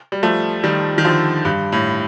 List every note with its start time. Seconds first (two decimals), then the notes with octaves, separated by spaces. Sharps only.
0.12 G3
0.23 F3 A3
0.64 D#3 G3
0.98 D#3
1.04 D3 F3
1.45 G2
1.72 A2